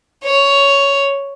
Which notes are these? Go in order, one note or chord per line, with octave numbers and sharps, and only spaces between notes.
C#5